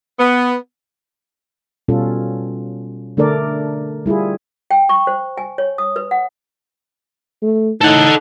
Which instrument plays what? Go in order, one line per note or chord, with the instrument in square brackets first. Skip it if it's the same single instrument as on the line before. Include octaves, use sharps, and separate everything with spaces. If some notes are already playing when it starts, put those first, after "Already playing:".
[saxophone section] B3
[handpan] B2 G3 C#4 F4 A4
D3 A3 D4 A4 A#4 D5
G3 E4 F4 G#4
[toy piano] G5
C#6
C5
G#5
C#5
D#6
B4
F#5
[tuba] A3
[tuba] A2 [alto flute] D#4 [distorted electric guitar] A4 F#5